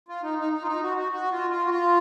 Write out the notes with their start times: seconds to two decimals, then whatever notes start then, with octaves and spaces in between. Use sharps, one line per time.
0.08 F4
0.23 D#4
0.39 D#4
0.53 D#4
0.62 F4
0.67 D#4
0.82 F#4
0.97 F#4
1.12 F#4
1.32 F4
1.51 F4
1.65 F#4
1.70 F4